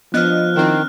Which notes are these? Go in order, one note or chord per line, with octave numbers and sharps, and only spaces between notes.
F3 B3 D4 D#5 F6 F#6
D#3 C4 D4 E4